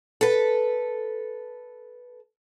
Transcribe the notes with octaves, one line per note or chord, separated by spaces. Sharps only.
A4 B4